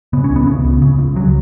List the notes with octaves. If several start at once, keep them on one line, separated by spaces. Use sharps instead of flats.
C#3 B3
C#4
C#2
B3
C#3
C#2
C#3
C#2
C#3 F#3